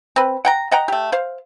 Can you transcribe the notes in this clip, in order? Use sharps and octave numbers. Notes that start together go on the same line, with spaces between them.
C4 B4
F#5 G5 A#5
D#5 F#5 G5 A#5
A3 G4
C5 F5